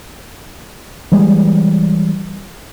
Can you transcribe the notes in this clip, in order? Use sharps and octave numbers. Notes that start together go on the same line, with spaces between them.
E3 G3 G#3